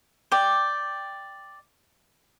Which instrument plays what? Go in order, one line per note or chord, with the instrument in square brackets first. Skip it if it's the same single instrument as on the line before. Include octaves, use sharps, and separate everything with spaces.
[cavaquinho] D5 G5